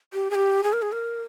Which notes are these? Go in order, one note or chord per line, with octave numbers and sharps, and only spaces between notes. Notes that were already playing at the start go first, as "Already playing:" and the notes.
G4
G#4
G4
G#4
A#4
G#4
A#4